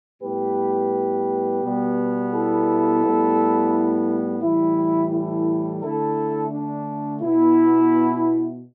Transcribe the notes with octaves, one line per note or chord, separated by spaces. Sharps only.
A2 G3 B3 G4 B4
B2 G3 B3
E4 A4
A2 G3 B3
A2 E3 G3 E4
E4 A4
D3 A3 E4 A4
D4
B2 B3 E4